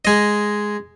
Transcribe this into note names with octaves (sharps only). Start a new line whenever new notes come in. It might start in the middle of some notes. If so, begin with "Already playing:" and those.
G#3 D#5